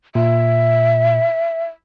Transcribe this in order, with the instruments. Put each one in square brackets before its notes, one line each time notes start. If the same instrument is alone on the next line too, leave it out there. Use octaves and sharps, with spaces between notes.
[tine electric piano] A#2 [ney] E5